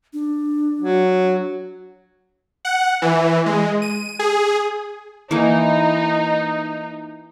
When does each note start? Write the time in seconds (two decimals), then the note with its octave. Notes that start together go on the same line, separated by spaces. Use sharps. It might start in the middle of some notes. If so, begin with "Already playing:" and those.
0.13 D4
0.81 F#3
2.65 F#5
3.02 E3
3.46 G#3
3.82 D#7
4.19 G#4
5.31 E3 A#3 D#4